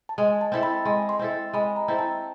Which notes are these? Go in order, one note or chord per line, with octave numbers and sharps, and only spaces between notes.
A5
G#3 G#5
A5
C4 E4 A4
B5
G#3 C6
C6
C4 E4 A4
G#3 B5
A#5
C4 E4 A4
A5